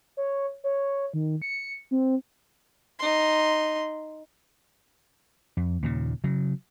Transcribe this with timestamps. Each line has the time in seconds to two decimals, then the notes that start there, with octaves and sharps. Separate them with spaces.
0.17 C#5
0.64 C#5
1.14 D#3
1.42 C#7
1.91 C4
2.99 D#4 C6
5.57 F2
5.83 D#2 A#2 C#3
6.24 C#3 F#3